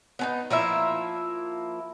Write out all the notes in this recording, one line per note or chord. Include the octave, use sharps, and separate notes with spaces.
B3 C#4 D#4
F3 A#3 E4 E5